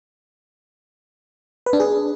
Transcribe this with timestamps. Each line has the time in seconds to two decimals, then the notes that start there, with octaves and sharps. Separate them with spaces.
1.66 B4
1.73 D4
1.80 G#4